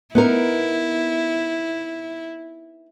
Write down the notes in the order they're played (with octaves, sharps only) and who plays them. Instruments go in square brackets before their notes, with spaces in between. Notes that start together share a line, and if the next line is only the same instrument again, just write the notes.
[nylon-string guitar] B3 D#4 A#4 [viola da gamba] E4